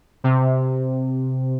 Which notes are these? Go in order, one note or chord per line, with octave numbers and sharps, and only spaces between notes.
C3